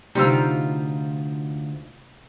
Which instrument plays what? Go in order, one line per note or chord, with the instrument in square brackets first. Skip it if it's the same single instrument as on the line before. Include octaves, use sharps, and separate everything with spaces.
[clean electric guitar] D2 [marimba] C3 A3 [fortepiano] G3 C4 E6 [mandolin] D#4 F4